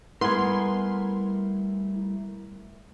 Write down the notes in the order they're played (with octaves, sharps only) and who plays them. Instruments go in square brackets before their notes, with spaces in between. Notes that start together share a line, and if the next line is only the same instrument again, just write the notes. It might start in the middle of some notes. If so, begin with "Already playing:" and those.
[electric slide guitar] G3 A3 A#4 [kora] B3 [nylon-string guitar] E4 G#5 [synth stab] C6